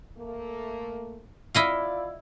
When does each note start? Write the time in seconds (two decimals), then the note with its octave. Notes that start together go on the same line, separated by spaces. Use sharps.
0.17 A3 A#3
1.55 E4 F4 D5 D#5 F5